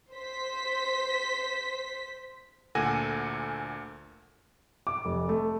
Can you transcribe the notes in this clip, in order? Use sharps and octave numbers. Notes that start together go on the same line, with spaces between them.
C5 B6
D2 A#2 A4 F#5 G#5 A#6
D6
F1
A3